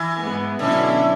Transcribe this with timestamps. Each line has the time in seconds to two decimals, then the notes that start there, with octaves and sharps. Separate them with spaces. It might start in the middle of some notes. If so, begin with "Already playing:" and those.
Already playing: E3
0.19 G#2 G#3 B3
0.59 B2 D3 F#3 C#4 E4